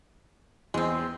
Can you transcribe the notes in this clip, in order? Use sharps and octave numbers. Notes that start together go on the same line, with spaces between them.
E2 G#3 C4